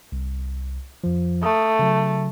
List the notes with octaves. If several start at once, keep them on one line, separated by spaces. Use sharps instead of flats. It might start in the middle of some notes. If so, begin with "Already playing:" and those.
C2
F2 F3
A3 D#6
C#3 F#3